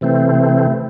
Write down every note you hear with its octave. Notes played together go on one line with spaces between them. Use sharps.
C3 E3 A3 C4